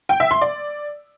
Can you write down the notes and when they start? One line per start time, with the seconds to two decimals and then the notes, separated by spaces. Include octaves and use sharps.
0.09 G5
0.20 E5
0.31 C6
0.41 D5